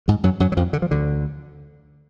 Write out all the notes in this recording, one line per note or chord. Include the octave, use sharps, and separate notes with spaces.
G#2 G#3
F#2 F#3
F#2 F#3
F#3
F2 F3
D3
F3
D2 D3